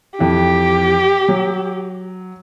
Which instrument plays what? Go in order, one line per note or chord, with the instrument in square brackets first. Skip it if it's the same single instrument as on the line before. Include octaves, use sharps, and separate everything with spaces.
[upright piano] F2 E3 [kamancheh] G4
[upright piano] F#3